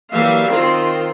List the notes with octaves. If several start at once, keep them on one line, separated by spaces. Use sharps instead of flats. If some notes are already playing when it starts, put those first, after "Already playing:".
E3 F#3 G3 A#3 E5 F5
D#3 C4 F4